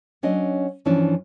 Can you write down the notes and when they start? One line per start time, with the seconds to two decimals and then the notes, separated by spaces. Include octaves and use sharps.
0.23 F#3 C#4 D4 D#5
0.85 G2 E3 F3 C#4 D4